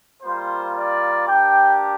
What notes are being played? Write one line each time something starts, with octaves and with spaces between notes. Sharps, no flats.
G3 A#3 F4 C5
D5
A#3 D4 G4 G5